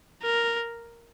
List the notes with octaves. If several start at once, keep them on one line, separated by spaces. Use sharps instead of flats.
A#4